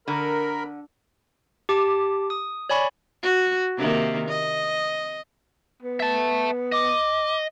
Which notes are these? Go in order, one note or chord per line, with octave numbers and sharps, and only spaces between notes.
D3 A#4 B5
G4 A5 D6
D#6
C#5 D5 G#5 B5 C#6
F#4
C3 D#3 A#3
D#5
B3
E5 A5
D#5 D6